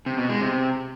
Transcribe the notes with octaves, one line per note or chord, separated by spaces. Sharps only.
C3
B2
G#3
C3